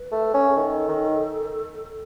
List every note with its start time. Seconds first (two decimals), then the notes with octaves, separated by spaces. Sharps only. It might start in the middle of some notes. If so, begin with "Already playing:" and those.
Already playing: B4
0.12 A3
0.34 C#4
0.48 G#4
0.56 D#3 A4
0.89 D#3